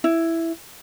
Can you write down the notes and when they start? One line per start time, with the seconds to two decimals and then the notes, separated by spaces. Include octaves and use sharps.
0.04 E4